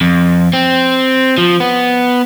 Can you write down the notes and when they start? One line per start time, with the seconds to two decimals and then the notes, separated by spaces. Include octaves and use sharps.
0.01 F2
0.53 C4
1.38 F3
1.60 B3